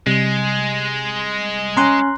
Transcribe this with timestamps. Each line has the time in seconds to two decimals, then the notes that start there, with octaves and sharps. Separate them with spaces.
0.07 C3 G3 G#3
1.77 C#4 G#5 A#5 C6 F#6